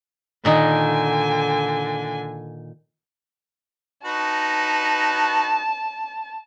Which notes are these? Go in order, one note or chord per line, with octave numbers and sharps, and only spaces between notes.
A#2 D3 D#3 D#4 G#5
D#4 F#4 B4 A5